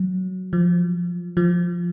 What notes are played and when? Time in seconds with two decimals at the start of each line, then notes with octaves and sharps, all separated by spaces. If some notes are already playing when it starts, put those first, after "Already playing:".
Already playing: F#3
0.53 F3
1.37 F3